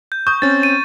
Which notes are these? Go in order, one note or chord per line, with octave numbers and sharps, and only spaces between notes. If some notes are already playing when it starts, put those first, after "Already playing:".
G6
C#6 D#6 G6
C4 C#4 A6
D#7